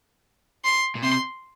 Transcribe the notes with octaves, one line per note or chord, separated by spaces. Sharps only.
C6
A#2
C3 C6